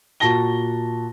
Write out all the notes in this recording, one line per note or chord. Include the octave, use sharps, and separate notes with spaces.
A#2 F#4 A5 A#6 G7